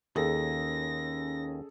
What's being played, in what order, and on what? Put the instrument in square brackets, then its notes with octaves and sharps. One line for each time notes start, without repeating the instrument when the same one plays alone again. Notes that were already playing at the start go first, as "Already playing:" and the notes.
[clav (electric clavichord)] D#2 [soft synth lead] C#4 [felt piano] G#4 A4 [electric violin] A#6